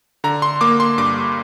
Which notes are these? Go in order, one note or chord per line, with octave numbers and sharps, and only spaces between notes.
D3 A#5
C6
A#3 D6
C6
G2 D6